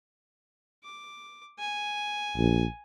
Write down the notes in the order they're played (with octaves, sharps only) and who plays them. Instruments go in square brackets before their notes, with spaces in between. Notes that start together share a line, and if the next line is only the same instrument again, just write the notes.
[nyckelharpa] D6
G#5
[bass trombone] A#1